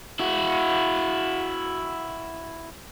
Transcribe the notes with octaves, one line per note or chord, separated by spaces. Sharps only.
E4 F#4